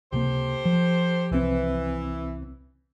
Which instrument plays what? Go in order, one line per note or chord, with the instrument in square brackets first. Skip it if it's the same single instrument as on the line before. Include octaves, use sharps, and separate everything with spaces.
[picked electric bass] C#2 C3 A#3 [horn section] G4 A4 C5
[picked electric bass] F3
[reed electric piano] C2 C4 [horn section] E3